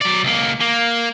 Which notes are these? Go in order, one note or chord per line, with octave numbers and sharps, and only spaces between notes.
F#3 D5
C#2 A#3
A#3